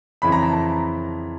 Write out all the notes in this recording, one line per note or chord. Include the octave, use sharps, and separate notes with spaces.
F2 C#3 E3 B5
A#5
A5
A#5